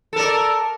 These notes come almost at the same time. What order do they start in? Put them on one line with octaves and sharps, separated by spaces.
A4 A#4 D5